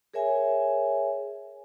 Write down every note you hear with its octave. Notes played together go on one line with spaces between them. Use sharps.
G#4 A#4 C#5 E5 G#5